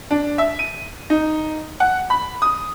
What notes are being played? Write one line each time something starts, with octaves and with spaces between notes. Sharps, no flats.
D4
E5
D#7
D#4
F#5
B5
D#6